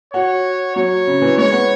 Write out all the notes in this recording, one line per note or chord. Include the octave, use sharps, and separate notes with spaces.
F#4 C#5
F#3 C#5
C#3
E3
G#3 C#5
B3